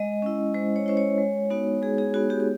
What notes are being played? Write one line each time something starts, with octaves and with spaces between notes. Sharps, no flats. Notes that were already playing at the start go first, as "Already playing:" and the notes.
Already playing: G#3 D#5
C#4 E4
G#3 C5
C#5
C#4 E4 C5
C#5
G#3
B3 D#4 F#4
G#3 G#4
G#4
B3 D#4 F#4
G4
G4